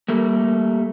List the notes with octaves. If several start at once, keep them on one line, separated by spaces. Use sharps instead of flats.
G3 A3 A#3